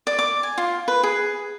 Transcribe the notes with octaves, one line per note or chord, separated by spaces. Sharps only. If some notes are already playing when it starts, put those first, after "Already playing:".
D5
D6
G#5
F4
B4
G#4